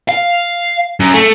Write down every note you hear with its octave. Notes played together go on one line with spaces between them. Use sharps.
F5
F#2
A3